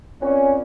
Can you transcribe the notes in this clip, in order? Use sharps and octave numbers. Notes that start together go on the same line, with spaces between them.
C4 C#4 F4 A#4 D5 F#5